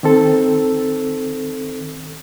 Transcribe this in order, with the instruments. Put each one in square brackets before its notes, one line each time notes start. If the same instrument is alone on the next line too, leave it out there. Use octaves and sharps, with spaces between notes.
[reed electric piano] D#3 C4 A4